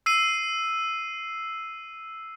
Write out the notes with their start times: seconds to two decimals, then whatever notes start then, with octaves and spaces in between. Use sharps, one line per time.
0.06 E6 C7 D#7